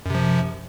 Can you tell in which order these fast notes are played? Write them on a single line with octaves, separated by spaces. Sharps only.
F#2 C3 F3